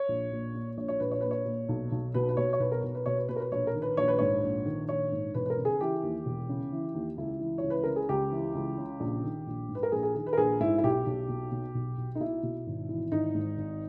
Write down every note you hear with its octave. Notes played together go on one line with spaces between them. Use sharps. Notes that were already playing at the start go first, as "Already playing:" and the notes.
Already playing: C#5
A#1
A#2
A#2
A#1 C#5
C#5
A#1 B4
C#5
A#2 B4
C#5
A#2
B1
B1
B2 B4
B4
B2 C#5
C#5
B1 B4
A#4
B1
B4
B2 C#5
B4
B2 B4
A#4
B4
A#1 C#5
A#4
D#3
B4
A#1 C#5
B4
G#2 C#5
A#1
D#3
A#1 C#5
G#2
E1 B4
B4
A#4
C#3
G#4
E3 G4
D#2
E1
C#3
E3
D#2
C#2 E4
E3
C#5
C#2
B4
C#3 A#4
G#4
C#2 G4
E3
C#2
C#3
A#1
D#3
A#1
G#2
B4
A#4
A#1 G#4
G#4
D#3 G#4
B4
A#4
A#1 G#4
G#2 E4
E4
B1 G4
B1
B2
B2
B1
B1
D#4
B2 E4
B2
G#1
E3
G#1 D#4
G#2
G#1